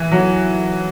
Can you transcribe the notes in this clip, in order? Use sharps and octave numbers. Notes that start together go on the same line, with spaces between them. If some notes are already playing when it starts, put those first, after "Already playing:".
Already playing: E3
F#3